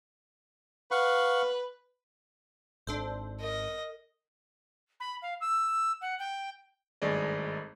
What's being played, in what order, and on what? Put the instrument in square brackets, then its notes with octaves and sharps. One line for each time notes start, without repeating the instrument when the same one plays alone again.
[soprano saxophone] B4 [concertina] F5 F#5 C#6
[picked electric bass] G#1 [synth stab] D4 A4 C5
[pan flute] A#4 [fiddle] D#5
[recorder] B5
F5
E6
F#5
G5
[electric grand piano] G#1 G2 A3 G#4 D5 D#5